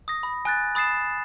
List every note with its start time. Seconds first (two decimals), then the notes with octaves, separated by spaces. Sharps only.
0.08 D#6 A#6
0.23 B5
0.45 G#5 F#6 A6
0.75 B5 D#6 A6 C7 E7